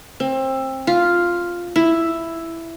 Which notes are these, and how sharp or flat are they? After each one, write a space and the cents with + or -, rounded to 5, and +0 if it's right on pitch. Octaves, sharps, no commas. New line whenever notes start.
C4 +25
F4 +0
E4 +5